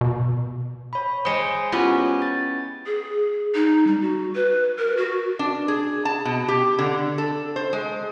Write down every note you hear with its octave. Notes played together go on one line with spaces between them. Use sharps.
B2
C#5 B5
G#3 C5 G5 D#6 C#7
B3 C#4 E4 F4 G4 G#5
A6
G#4
D#4
G3
F#4
B4
A#4
F#4
D4
G#4
A5
B2
G4
D3
A4
C5
G#3